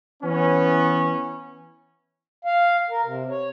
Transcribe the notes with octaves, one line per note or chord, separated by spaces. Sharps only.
E3 B3 C#4
F5
A#4
C3
C#5